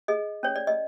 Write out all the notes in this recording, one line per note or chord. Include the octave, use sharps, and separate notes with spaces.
G#4 D#5
C#4 C#5
D5
D#5